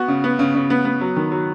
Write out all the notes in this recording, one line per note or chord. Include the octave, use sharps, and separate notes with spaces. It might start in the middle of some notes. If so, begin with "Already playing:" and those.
Already playing: B3 F#4
C#3
B3
C#3
C#3
B3
B3
F#3
D#3
F#3